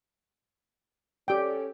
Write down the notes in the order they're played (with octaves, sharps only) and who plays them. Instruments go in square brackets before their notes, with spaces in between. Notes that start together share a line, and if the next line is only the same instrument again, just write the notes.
[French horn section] C#4 A4 D5 [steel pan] G4 G5